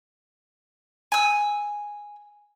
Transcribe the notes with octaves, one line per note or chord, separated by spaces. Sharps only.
G#5 E6